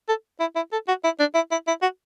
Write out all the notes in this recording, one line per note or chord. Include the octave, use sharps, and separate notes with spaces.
A4
E4
E4
A4
F#4
E4
D4
E4
E4
E4
F#4